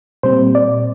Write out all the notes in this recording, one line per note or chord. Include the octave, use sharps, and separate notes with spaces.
A#2 G3 C4 C5
D5